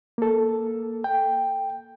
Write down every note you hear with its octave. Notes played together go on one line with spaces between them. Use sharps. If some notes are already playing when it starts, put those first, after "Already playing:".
A#3 A4
G5